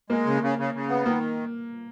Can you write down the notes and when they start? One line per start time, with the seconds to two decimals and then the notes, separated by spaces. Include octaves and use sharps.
0.10 G#3 A#3
0.26 C#3
0.42 C#3
0.59 C#3
0.74 C#3
0.89 B3
1.05 D#3 A#3